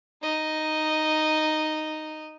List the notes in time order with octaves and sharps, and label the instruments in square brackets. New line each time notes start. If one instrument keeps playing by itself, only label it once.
[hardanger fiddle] D#4 D#5